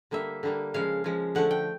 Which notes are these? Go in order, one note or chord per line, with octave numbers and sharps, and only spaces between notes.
D3 G3 A#3 E5
D3 G3 A#3
C#3 F3 G#3 F5
C#3 F3 G#3
D3 F3 A3 F#5
G5